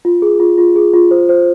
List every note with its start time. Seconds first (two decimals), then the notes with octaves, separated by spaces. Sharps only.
0.05 F4
0.22 G#4
0.40 F4
0.58 F4
0.76 G#4
0.93 F4
1.11 C5
1.29 C5